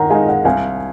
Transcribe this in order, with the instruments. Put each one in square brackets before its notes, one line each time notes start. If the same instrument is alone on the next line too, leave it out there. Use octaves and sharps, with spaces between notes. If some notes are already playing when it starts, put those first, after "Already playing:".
Already playing: [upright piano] D#3 [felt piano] F#5 A#5
[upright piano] G#3 D#4 [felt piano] F5 G#5
[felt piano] D#5 F#5
[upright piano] C2 [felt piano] F5 G#5